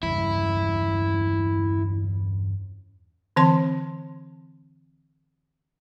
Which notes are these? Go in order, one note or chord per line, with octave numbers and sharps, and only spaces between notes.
E2 G2 C#3 E4
D3 E3 C4 A5 C6